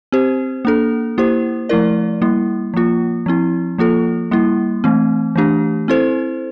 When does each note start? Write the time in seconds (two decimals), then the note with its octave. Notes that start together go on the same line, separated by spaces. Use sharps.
0.12 C4 G4 C5
0.65 A#3 D4 A4
1.18 A#3 E4 G4 C5
1.69 F3 A3 E4 A#4 D5
2.22 G3 A#3 E4
2.74 F3 A#3 F4
3.26 F3 C4 E4
3.78 F3 A#3 F4 A4
4.31 G3 A#3 E4
4.84 E3 A3 C4
5.36 E3 A3 D4 G4
5.88 C4 E4 A4 C5